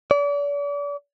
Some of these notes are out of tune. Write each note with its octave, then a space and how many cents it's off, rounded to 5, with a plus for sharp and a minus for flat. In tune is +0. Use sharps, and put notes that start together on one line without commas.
D5 -40